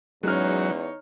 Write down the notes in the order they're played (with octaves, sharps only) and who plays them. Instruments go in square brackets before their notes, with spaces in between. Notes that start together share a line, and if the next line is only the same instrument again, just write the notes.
[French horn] E2 [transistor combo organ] F#3 [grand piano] G#3 C#4 F6 [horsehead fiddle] D#4 C#5